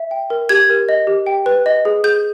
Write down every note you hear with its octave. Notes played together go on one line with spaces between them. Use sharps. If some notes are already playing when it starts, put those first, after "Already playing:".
Already playing: E5
G5
A#4
G4 G#6
A#4
D#5
G4
G5
B4
D#5
G#4
G#4 G6